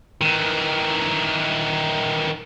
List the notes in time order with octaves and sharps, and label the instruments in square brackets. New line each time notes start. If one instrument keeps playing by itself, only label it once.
[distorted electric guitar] D#3 E3